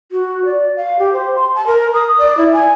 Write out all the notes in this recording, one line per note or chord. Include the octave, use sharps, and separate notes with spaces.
F#4
D5
F5
G4
C5
C6
A5
A#4
D#6
D5
E4
G#5